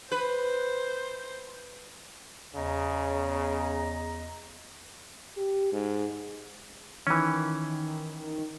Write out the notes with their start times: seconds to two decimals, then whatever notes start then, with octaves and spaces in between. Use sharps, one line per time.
0.12 B4 C5
2.55 E2 C#3 D#5 A#5
5.37 G4
5.72 G#2
7.07 D#3 E3 C#4